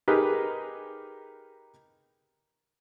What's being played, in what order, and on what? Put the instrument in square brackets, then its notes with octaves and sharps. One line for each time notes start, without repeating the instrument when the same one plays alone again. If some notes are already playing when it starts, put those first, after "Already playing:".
[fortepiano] D#4 G4 G#4 A#4 B4